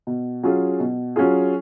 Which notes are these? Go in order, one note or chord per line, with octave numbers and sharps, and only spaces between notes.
B2
F#3 C#4 F4 G#4
B2
F#3 C#4 F4 G#4